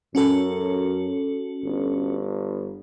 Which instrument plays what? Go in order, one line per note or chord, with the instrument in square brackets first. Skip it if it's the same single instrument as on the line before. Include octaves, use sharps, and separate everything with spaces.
[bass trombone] F#2 [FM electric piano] C#4 F#4 A4
[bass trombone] G1